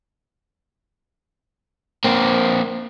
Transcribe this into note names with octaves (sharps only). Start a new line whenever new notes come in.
A#3 C4